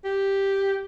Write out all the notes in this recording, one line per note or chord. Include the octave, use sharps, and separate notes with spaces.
G4